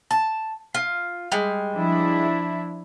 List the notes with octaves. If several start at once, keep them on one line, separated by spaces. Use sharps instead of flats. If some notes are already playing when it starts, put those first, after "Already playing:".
A5
F4
G3 G#3
F3 D4 E4